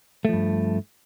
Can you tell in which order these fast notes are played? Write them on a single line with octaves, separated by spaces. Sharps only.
A3 F3 G2